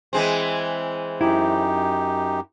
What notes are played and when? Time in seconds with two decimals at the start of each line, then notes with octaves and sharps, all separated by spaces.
0.13 E3 G#3 C4
1.21 F#2 D#4 E4 G4